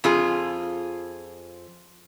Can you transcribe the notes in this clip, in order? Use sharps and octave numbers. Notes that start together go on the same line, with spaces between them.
F2 F4 G#4